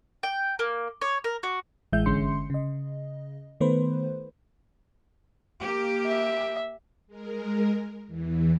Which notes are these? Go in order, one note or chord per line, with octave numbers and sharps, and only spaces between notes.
G5
A#3
C#5
A#4
F#4
A1 E3 G#3 E5 G6
G1 D3 G#3 C#4 C6 C#7
C#3 D#5
D#3 A3 B3 B4 C5
A#3 G4
E5
G#3 A#4
E2 E3